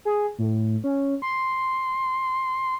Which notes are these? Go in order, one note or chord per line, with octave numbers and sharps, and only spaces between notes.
G#4
A2
C#4
C6